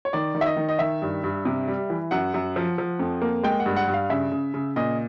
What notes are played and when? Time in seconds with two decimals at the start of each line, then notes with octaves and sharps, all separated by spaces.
0.05 C#5
0.13 D#3 D5
0.35 D#3
0.41 E5
0.46 D#5
0.57 D#3
0.69 D#5
0.79 D#3 E5
1.02 G2
1.24 G2
1.45 C3
1.68 G3
1.90 E3
2.11 F#2 F#5
2.34 F#2
2.56 F3
2.78 F3
2.99 F2
3.22 A#3
3.43 G#3 G5
3.60 F#5
3.66 G2
3.76 F#5
3.87 G2
3.94 F5
4.10 C#3 E5
4.32 C#3
4.54 C#3
4.76 A#2 D#5